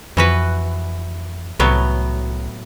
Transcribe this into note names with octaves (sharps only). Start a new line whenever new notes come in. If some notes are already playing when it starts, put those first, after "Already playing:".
F2 E3 F#4 B4
C2 A2 F#3 B3